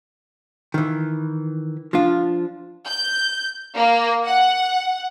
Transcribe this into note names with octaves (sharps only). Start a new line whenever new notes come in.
D#3 E3
F3 D4 F4
G6
A#3
F#5